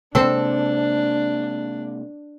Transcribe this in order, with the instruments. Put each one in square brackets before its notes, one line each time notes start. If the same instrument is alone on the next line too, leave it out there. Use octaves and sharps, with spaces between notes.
[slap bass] C3 G#3 A#3 [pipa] C4 A4 [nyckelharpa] D4